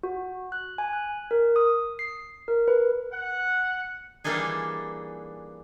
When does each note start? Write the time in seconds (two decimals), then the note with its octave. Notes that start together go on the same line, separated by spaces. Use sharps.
0.03 F#4
0.52 F#6
0.78 G#5
0.93 F#6
1.31 A#4
1.56 D#6
1.99 C7
2.48 A#4
2.68 B4
3.11 F#5
4.24 E3 G3 A#3 D4 D#4 G#4